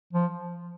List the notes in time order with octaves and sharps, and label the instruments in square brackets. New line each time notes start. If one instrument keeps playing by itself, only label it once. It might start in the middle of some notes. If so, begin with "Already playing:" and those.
[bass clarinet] F3